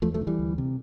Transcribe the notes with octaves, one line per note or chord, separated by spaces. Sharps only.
E2 F3 A3
F3 A3
D3
E3 G3
D2
C3